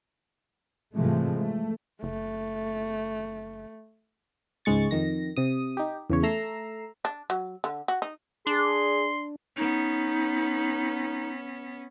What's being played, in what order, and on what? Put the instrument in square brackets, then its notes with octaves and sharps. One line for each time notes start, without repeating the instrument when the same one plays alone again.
[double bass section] G#2 C3 E3 F3 G#3 A3
A3
[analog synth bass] F#1 [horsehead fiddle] A3
[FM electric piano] C#2 G#2 G#3 C#6 A6
F2 D#3 A#6
C3 D#6
D#4 G4
E2 C#3 C#5
A3 A#5 E6 C7
[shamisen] D4
F#3
D3
F#4
D#4
[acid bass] D4 [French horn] G#4 [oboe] C6
[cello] B3 C#4 [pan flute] D#4